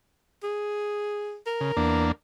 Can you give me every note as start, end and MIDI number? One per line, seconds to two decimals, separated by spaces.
0.43 1.37 68
1.47 2.07 70
1.61 1.72 49
1.77 2.12 40
1.77 2.12 58
1.77 2.12 62